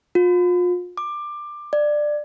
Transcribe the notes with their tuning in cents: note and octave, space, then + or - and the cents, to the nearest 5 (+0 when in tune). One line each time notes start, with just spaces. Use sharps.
F4 +35
D6 +15
D5 +15